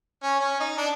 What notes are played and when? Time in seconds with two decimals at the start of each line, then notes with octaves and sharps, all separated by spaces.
0.23 C#4
0.40 C#4
0.60 D#4
0.78 D4